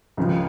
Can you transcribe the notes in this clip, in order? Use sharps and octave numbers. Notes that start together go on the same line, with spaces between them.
C#2 C#3 F3